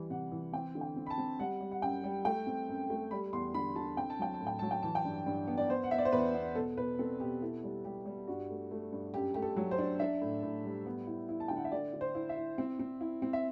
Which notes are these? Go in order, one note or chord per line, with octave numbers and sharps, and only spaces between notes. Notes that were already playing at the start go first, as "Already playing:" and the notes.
Already playing: E3 G3
C3 F#5
E3
C4 G5
D3
G5
C4
B5
A5
C4
G3 F#5
G3
F#5
F#2 G5
G3
A3 G5
C4
F#2
A3
G3 B5
E2 C6
D3 B5
D3 A5
C4 G5
A5
F#3 G5
A5
A2
G5
F#3 A5
G5
E3 A5
G5
G2
G2
B3
D5
B3 C5
F#5
B3 E5
D5
C5
E2 B4
B3
B2 A4
B2 B4
C4 A4
B2 G4
E4 A4
G3
G3 G4
G3
G2 F#4
A3
A3
G2
F#2 G4
A3 G4
A4
F#3
C5
D4
D4 E5
A2
A2
G3
B3
E4
E4
A5
D3 G5
F#5
E5
D3 D5
D3
C5
E4
E5
E4
C4
C4
E4
C4
E5